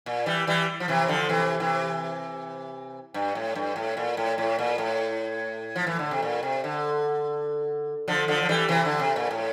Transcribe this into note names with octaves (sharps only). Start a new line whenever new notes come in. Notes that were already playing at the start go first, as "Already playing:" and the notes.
A#2
E3 G3
E3 G3
F3
C3 E3
D3 F3
C3 E3
C3 E3
G2
A2
G2
A2
A#2
A2
A2
A#2
A2
F3
E3
D3
C3
A#2
C3
D3
D3 F3
D3 F3
F3
E3 G3
C3 E3
D3
C3
A#2
A2